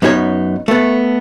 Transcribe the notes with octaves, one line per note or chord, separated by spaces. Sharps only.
F#2 B3 D#4 G#4 C#5
A3 B3